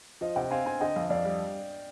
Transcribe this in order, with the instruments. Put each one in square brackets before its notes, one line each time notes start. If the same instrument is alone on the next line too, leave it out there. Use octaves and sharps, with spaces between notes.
[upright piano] F3 [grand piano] C5 D#5
[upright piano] C3 [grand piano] D#5 G5
[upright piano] C4 [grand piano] F5 G#5
[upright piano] C4 [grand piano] F5 G#5
[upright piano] D3 [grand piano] D#5 G5
[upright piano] F2 [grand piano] F5
[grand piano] D#5
[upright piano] F2 [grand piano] D5 F5
[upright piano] G3